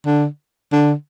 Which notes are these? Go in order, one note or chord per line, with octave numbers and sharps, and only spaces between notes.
D3
D3